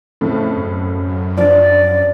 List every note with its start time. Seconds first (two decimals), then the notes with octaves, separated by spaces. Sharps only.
0.21 F2 A2 C#3 A3
0.57 F#2
1.37 F3 D4 D5